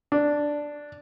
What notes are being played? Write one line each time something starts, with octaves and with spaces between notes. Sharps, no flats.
D4